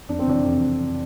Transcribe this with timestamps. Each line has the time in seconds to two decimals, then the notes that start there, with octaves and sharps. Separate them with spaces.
0.09 F2 D4
0.19 C4
0.26 C3 E3 D4
0.44 F2